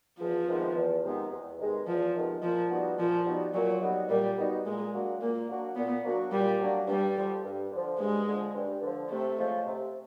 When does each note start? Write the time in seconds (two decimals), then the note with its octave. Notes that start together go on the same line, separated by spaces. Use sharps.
0.20 E2 F3
0.48 C3 D#3 G#3 B3
0.76 E2
1.03 C3 D#3 G#3 B3
1.31 E2
1.59 C3 D#3 G#3 B3
1.87 E2 F3
2.15 C3 D#3 G#3 B3
2.42 A#2 F3
2.70 G3 B3 D#4 F#4
2.99 A#2 F3
3.26 G3 B3 D#4 F#4
3.54 A#2 F#3
3.81 G3 B3 D#4 F#4
4.09 A#2 G3
4.37 G3 B3 D#4 F#4
4.65 A#2 G#3
4.93 F#3 A#3 D4 F#4
5.21 A#2 A#3
5.49 F#3 A#3 D4 F#4
5.76 A#2 B3
6.04 F#3 A#3 D4 F#4
6.32 A#2 G3
6.60 F#3 A#3 D4 F#4
6.87 G2 G3
7.16 D3 F3
7.44 G2
7.71 D3 F3
7.99 G2 G#3
8.27 D3 F3
8.55 G2
8.83 D3 F3
9.10 C3 A3
9.38 F3 G#3 C#4 F4
9.66 C3